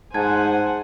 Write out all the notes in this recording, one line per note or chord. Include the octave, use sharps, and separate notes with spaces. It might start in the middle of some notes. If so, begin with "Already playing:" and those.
G#2 C5 F#5 G#5 A5 G#6